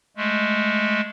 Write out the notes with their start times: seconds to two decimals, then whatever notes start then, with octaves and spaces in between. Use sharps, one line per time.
0.17 G#3 A3